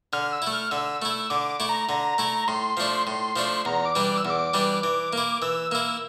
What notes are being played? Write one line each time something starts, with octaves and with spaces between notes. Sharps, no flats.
D3 F6
E6
A3 E4
F6
D3 E6
A3 E4
D3 D6
D6
A3 E4
A#5
D3 A#5
A3 E4
A2 C6
F3 A3 D4
A2
F3 A3 D4
E2 A#5
D6
E3 G3 D4
D6
E6
E2
D6
E3 G3 D4
E3
A#3 E4
E3 E6
A#3 E4 E6